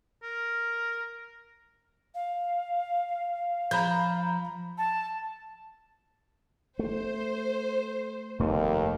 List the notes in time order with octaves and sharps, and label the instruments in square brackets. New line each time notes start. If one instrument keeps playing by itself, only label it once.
[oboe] A#4
[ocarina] F5
[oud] F3 [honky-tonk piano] A#5 B5 G6
[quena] A5
[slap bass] A3 [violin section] C5
[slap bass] F1 A3 B3 [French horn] D#2